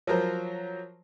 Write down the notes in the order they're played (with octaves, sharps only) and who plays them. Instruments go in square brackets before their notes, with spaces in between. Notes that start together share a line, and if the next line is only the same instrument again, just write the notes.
[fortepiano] F3 F#3 A#4 C5